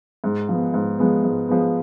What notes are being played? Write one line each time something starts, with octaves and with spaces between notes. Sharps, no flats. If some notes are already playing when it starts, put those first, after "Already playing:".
G#2
F3 G#3 B3
G#2
F3 G#3 B3
G#2
F3 G#3 B3